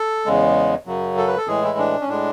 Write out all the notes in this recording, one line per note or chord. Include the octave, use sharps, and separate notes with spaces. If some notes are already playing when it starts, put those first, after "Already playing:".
Already playing: A4
E2 C#3 G#3
F#2 C#3 F#3
A4
B4
A4
A2 E3 G#3 G#4
E4
D4
C#4
A2 G#3 D4